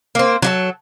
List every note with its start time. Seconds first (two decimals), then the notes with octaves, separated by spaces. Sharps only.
0.15 A#3 C4
0.42 F#3 F#4 A4